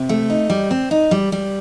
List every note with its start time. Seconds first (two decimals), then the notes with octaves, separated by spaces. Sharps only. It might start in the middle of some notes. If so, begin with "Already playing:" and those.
Already playing: C3
0.09 A3
0.30 D#4
0.50 G3
0.71 C4
0.91 D#4
1.11 G3
1.32 G3